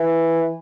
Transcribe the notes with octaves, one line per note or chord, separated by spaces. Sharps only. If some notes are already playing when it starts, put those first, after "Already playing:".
Already playing: E3